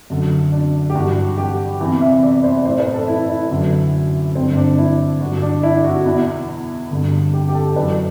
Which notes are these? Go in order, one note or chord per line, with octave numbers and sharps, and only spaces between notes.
F#2 D3
D4
G4
G2 E3 F#4
G4
E2 C3 E3
E5
D5
C5
D5
A2 E3 C5
B4
A4
E4
E4
F#2 D3
G2 D3 C4
D4
E4
G2 D3 F#4
D4
E4
F#4
E2 B2 E4
G2 D3
G4
G4
A4
F#2 E3 B4